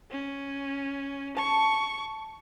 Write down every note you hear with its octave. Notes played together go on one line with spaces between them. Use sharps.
C#4
A5 C#6